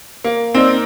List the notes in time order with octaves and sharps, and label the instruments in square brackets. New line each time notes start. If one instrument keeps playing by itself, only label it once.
[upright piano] A#3
[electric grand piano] A#3 D#4 A#4 D5 [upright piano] C4